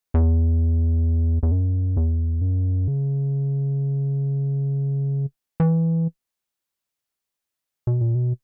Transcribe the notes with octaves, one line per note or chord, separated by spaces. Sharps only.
E2
E2
F#2
E2
F#2
C#3
E3
B2
A#2
B2